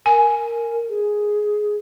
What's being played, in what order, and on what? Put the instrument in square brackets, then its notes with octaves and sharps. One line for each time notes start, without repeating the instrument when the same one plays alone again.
[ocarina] A#4 [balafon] G#5
[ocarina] G#4